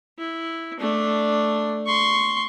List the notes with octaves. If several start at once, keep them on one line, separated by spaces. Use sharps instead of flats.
E4
A3 D4
C6 C#6